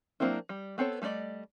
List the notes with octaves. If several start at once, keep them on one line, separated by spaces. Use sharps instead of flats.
F#3 A#3 C4 D4 E4
G3
B3 C4 A4 C#5
G3 A3 F#4 D5 D#5